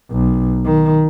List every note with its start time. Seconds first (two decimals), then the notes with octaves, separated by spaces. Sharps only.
0.12 B1
0.65 D#3